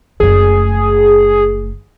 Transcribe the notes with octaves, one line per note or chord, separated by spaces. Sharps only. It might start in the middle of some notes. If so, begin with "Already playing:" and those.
F#1 A3 G#4